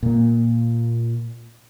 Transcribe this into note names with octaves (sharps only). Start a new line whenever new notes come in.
A#2 A#3